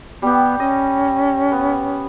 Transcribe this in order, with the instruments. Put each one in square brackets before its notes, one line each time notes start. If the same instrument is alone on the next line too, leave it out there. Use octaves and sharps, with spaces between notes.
[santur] G3 G4 [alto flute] B3
[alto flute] C#4 [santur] D#5
[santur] B3